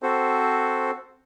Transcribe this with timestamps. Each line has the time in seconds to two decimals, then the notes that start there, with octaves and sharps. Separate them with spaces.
0.02 C4 F#4 A4 C5